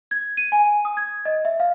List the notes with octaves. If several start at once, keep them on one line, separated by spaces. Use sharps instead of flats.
G#6
D#7
G#5
D#6
G#6
D#5
E5
F5